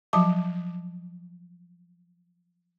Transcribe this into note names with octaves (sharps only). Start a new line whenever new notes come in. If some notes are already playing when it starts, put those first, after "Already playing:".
F3 F#3 A5